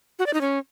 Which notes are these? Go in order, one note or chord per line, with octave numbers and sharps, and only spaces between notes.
F#4
D5
D#4
C#4